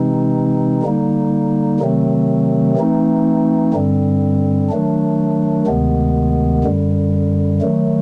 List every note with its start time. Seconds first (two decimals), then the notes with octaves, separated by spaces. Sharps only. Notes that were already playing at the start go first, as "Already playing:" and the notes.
Already playing: C3 E3 G#3 C4 D#4
0.83 D3 G3 A#3 D#4
1.80 C3 D#3 F#3 A3 C4
2.77 E3 A3 C4 D#4
3.74 G2 D3 G3 C4
4.70 D#3 F#3 A3 D4
5.67 D2 C3 D#3 G#3 B3
6.64 F#2 D3 G3
7.61 D#3 F#3 A3